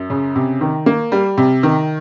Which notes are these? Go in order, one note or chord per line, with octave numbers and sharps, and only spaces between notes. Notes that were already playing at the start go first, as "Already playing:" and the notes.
Already playing: F#2
C#3
C3
D#3
A#3
G3
C3
D#3